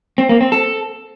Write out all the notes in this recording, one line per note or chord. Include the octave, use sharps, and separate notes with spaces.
C4
A#3
C4
A4